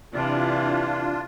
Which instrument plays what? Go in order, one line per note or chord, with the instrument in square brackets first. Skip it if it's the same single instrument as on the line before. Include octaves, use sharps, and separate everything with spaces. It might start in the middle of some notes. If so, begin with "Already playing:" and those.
[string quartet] C3 E3 [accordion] D4 F4